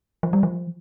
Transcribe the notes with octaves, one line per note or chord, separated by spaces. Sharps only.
F3
G3
F3